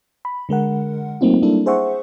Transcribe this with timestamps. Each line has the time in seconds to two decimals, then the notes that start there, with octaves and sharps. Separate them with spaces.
0.25 B5
0.49 D3 G#3 A#4 F#5
1.21 F#3 A3 A#3 C4 D#4 F4
1.42 G3 A#3 D4 E4 A4
1.66 G#4 C5 E5 F#5 C#6